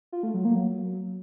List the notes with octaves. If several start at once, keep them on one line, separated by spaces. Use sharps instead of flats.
F4
A3
F#3
A#3
F#3